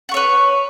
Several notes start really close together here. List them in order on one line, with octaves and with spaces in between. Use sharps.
F#5 C#6 C#5 B4